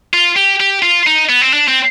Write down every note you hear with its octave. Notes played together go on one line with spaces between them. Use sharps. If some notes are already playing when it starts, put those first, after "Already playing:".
F4
G4
G4
F4
D#4
B3
C4
D4
C4